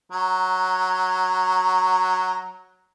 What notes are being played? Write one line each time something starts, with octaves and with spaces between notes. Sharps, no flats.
F#3 A#5